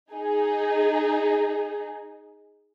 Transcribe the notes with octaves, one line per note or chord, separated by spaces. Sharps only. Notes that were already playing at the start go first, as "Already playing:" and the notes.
D#4 G#4